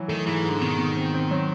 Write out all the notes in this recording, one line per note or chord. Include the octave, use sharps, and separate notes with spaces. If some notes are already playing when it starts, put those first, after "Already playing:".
Already playing: E3 F#3
D#3 A3
G#2 E3
G#2
D3
B2 D#3
B2
C4
C4
F#3